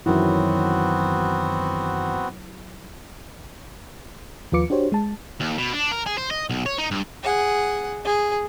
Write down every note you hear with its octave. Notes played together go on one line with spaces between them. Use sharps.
F#2 D#3 E3 F#3 B3 C4 E4 F#4
D#2 F3 F4 B4 D6 C#7
D4 F#4 G4 C5 C#5
G#3 A5
D#2
B2
D4
A#4
G#4
C5
D#5
B1
C#5
D#4
G2
G#4 F#5
G#4